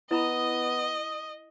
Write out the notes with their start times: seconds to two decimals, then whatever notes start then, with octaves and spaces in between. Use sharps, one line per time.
0.11 B3 E4 D#5 A#5 B5 D#6